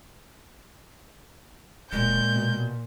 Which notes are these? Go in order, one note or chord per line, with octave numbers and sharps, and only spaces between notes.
D1 A#2 G#3 G6
B2